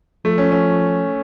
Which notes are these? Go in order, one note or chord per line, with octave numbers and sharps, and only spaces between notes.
F3 A3
C#4
C#4